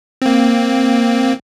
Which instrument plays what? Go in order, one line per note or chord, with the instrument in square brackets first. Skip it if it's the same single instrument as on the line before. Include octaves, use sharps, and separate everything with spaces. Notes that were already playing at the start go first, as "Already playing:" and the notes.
[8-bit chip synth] A#3 C4